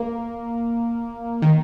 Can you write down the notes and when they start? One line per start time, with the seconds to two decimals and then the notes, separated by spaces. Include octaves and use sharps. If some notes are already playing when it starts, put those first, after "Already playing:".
Already playing: A#3
1.42 D#3